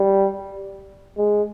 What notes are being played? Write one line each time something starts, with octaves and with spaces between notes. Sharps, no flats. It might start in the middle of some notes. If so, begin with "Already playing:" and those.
Already playing: G3
G#3